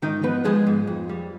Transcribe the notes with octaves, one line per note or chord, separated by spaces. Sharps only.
G#2 D#3 D#4
F3 B3 B4
F3 G#3 G#4
G#2
F2
G3